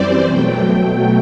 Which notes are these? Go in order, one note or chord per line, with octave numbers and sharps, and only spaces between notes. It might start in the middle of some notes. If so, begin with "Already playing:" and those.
Already playing: F#2 E3 G3 C4 C5 D5
B2 F#3 A3 G5